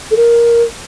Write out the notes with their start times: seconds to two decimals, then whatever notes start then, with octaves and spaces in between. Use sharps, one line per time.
0.11 A4
0.16 A#4